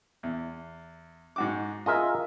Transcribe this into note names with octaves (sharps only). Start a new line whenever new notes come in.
E2
G#2 F#4 D6
F4 G#4 A#4 D#5 E5